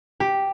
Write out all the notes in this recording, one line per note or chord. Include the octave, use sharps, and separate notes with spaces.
G4